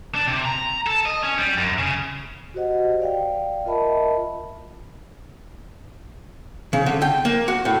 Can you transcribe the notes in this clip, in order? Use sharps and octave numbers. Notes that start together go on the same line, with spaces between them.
D4
C3
A#5
A4
D#5
C#4
G3
F#2
C#3
F#4 G4 C5 D#5 F#5
D5 F5 G5
F4 A#4 D#5 E5 A5 B5
C#3
D3
G5
A#3
F#4
A2